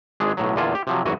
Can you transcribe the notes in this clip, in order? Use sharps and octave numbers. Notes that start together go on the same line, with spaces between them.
G#1 G#3 D4 G#4
B1 A2 F#3
E2 A#2 D3 F4 G#5 A5
G4
C3 F3 F#3
G#1 F#2 E3 F#4 G#5